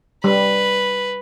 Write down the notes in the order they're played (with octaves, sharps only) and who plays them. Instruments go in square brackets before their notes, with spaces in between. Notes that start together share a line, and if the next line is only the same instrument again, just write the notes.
[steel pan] G3 [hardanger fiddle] B4